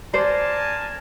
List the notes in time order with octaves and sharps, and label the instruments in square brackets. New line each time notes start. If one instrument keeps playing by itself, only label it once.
[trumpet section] A#4 G#5 A5 [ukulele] C5 D5